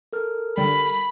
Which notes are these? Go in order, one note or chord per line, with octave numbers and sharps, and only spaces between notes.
A4 A#4 F6
D3 G3 B5